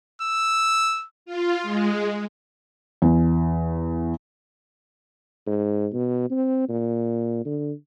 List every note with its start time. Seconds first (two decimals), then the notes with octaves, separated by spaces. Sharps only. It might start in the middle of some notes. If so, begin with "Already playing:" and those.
0.22 E6
1.26 F4
1.63 G#3
3.02 E2
5.47 G#2
5.93 B2
6.31 C4
6.69 A#2
7.45 D3